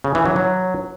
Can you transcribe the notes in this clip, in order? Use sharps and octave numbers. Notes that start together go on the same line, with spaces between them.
C#3
E3
F#3
F#3